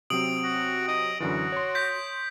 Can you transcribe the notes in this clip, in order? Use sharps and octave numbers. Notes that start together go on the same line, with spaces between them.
C3 F#3 C4 D#6 D7 F#7
F#4
D#5
F#2 D3 E3 F#4
C#5 C6
G6 B6